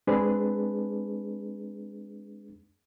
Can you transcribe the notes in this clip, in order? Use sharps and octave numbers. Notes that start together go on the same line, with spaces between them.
G#3 C4 D4 G#4 B4